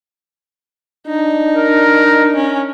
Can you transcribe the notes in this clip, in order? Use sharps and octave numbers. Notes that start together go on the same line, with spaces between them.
D4 D#4
A#4
C#4